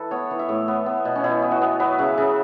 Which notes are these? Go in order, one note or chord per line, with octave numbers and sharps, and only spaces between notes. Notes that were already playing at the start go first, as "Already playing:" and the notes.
Already playing: E3 A4 B4
B3 C#5
E3
E5
A2
B3
B3
B2
C#4
B2 E4
B3
F#4
B3
F#3 B4
C#3 E5
C#3 E5